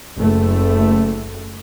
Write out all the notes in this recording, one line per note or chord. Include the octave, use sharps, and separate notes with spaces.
F#1 A3